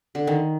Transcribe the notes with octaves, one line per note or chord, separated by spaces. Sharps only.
D3
D#3